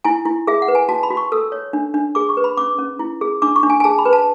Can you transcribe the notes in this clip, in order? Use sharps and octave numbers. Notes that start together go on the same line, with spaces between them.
E4 G#5
E4
G#4 E5
F#5
B4
G#5
F#4 A5
B5
F#4
C#6
A4 E6
C#5
D4
D4
G#4 D6
C#6
B4
B5
C#4 D6
C#4
E4
G#4
D4 D6
C#6
D4
G#5
G#5
G#4 A5
B5
B4
A5